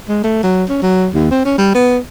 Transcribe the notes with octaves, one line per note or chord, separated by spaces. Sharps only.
G#3
A3
F#3
C#4
F#3
D#2
C4
C#4
G3
B3